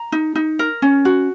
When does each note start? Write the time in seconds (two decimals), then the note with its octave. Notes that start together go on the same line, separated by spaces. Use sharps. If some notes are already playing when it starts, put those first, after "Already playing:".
Already playing: A#5
0.12 D#4
0.35 D#4
0.59 A#4
0.82 C#4
1.05 F#4